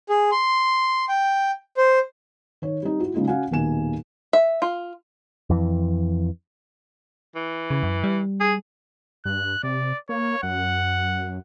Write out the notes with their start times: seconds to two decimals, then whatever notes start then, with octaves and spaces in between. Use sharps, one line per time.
0.09 G#4
0.31 C6
1.09 G5
1.77 C5
2.62 D#3 C#5
2.83 G3 C4 D#4
3.00 E4 F#4
3.14 C#3 F#3 G#3 A#3 D#4 F4
3.27 C#4 F#4 F5 F#5 G#5
3.51 D#1 B2 D#3 A#3 G#5 E7
4.33 E5
4.62 F4
5.50 F2 E3
7.35 E3
7.70 C#3
7.83 F#2
8.04 G3
8.40 G#4
9.25 G2 F#6
9.63 C3 D5
10.09 A#3 C#5
10.43 F#2 F#5